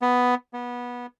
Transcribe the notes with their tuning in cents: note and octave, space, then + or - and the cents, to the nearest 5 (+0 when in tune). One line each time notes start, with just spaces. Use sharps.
B3 +5
B3 -20